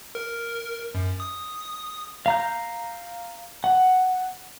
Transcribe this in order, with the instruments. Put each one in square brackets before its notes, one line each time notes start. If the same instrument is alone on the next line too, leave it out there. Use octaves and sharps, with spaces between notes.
[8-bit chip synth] A#4
F#2
D#6
[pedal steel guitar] F5 A#5 G6
F#5